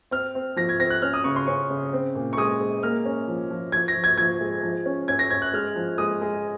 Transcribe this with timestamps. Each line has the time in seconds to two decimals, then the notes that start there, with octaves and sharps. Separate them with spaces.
0.11 C4 F6
0.35 C4
0.56 F3 A#6
0.69 G#6
0.80 C4 A#6
0.90 F#6
1.02 C#4 F6
1.14 D#6
1.24 C#3 C#6
1.36 C6
1.47 C#4 C#6
1.70 C#3
1.93 C4
2.15 A#2
2.33 C#6
2.37 G#3 D#6
2.60 G#3
2.83 A#3 F6
3.05 C#4
3.28 F3
3.51 F3
3.72 F3 G#6
3.88 A#6
3.95 F3
4.04 G#6
4.18 F3 G#6
4.40 G#3
4.63 F3
4.86 C#4
5.08 C#4 G#6
5.19 A#6
5.30 C#4 G#6
5.42 F#6
5.53 G#3 F6
5.76 F3
5.98 G#3 D#6
6.21 G#3